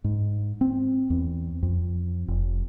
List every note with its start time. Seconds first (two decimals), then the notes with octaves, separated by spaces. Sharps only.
0.04 G#2
0.61 C4
1.10 E2
1.63 F2
2.28 F1